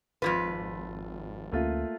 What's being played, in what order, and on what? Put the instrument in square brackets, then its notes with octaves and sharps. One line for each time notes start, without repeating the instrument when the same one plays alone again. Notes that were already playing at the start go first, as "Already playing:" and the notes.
[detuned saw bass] G#1 [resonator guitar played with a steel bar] F2 C3 B4 [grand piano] F4
[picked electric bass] D2 C#4 [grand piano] A3 A#3 F4